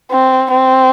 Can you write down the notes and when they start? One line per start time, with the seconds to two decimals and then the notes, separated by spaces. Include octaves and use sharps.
0.11 C4
0.51 C4